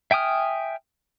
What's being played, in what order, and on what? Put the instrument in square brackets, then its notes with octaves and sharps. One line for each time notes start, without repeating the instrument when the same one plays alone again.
[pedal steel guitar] E5 G5 G#5 D#6 F6